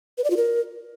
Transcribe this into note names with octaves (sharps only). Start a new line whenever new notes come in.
B4
D5
F4
A#4